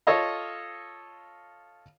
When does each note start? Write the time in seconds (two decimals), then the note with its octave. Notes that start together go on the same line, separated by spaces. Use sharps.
0.07 F4 A4 C#5 D#5 F5